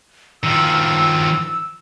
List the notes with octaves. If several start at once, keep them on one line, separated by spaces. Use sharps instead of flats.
D#3 F3 E6